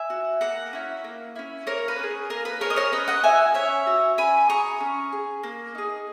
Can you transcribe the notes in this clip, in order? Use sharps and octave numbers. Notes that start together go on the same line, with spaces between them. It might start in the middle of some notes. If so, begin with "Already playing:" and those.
Already playing: E5 G#5
F#4
A#3 F#5 A#5
C#4 E4
A#3
C#4 E4
A#3 A#4 C#5
B4
C#4 G#4
A#3 A#4
B4
C#4 G#4 A#4 C#5
D#5
A#4 C#5
C#4 B4 D#5
D#5 F#5
F#4 E5 G#5
C#4 C#5 E5
F#4
C#4 G#5 B5
G#4 A#5 C#6
C#4
G#4
A#3
D#4 G#4